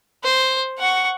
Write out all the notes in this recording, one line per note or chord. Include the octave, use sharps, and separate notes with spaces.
C5
F#5 C#6